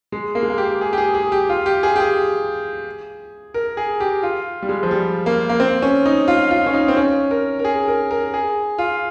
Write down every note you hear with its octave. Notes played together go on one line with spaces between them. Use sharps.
G#3
A#3
G#3
A#3
G4
G#4
G4
G#4
G#4
G4
F4
G4
G#4
G4
G#4
A#4
G#4
G4
F4
G3
G#3
F3
G3
A#3
A#3
C4
C#4
D#4
F4
F4
C#4
D#4
C4
C#4
A#4
A#4
G#4
A#4
A#4
G#4
F4